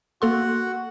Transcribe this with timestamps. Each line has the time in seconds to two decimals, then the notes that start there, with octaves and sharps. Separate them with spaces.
0.22 A#3 F#4 A4 F#5 C6